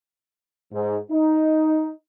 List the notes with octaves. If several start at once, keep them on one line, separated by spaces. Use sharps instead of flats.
G#2
D#4